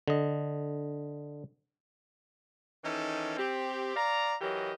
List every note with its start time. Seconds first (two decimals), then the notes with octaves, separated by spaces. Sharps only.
0.08 D3 D#5
2.83 D#3 E3 C#4 D#4 A4
3.37 C4 G4
3.96 D5 F5 A#5
4.41 E3 F#3 G4 A#4 D#5